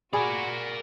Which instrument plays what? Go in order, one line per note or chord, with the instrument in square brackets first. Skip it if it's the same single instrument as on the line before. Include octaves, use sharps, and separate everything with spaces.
[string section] F#4 [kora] G#4 [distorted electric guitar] A#4 D5 [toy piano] G#5 B5